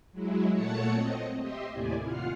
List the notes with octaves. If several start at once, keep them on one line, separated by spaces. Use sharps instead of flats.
F#3 G#3 E4
A#2 A3 C#5 F#5 A5 C#7
C4 D#5
G4 D#5 E5 C6
D#2 A2 C3 E4 D5 G#5
F4 F#5 F6 C7